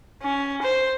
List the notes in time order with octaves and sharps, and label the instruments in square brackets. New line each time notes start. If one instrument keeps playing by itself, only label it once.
[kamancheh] C#4
C5